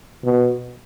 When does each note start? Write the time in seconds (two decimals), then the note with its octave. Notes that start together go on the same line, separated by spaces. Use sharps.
0.24 B2